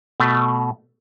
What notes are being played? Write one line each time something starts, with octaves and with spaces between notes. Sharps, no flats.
B2 A3